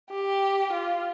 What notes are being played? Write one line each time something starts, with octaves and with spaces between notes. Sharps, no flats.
G4
F4